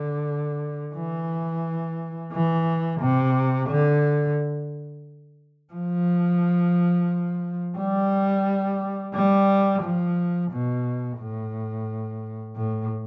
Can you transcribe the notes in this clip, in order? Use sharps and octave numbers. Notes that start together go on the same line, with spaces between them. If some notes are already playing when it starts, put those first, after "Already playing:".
Already playing: D3
E3
E3
C3
D3
F3
G3
G3
F3
B2
A2
A2